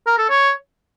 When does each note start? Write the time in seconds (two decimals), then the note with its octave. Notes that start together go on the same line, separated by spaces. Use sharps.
0.07 A#4
0.18 A4
0.30 C#5